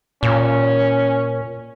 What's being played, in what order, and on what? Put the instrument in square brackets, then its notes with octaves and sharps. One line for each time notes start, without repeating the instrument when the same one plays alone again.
[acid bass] A#2 [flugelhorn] C#4